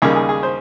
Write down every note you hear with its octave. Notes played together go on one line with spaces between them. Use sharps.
D#2 C#3 G3 A#3 G#4
G#4
G#4
C5